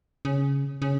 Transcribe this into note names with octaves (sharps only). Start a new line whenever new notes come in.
C#3
C#3